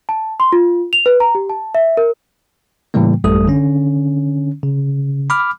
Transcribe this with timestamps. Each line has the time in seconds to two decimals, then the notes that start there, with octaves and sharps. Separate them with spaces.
0.09 A5
0.40 C6
0.52 F4
0.93 F7
1.06 B4
1.20 A#5
1.35 G4
1.50 A5
1.75 E5
1.97 A#4
2.94 A2 C#3 E3 G3 A#3
3.24 A1 F#2 G3 A3 A4 D#6
3.48 D3 C#4
4.63 C#3
5.30 B5 D6 F6